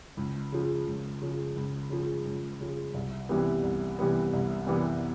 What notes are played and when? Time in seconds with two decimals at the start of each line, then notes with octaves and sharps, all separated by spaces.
0.17 C#2
0.52 C#3 F3 G#3
0.86 C#2
1.22 C#3 F3 G#3
1.56 C#2
1.90 C#3 F3 G#3
2.25 C#2
2.60 C#3 F3 G#3
2.94 C2
3.29 C3 E3 G3 B3
3.63 C2
3.99 C3 E3 G3 B3
4.33 C2
4.67 C3 E3 G3 B3